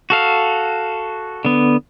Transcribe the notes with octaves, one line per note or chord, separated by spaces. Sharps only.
F#4 A4 F5
D3 B3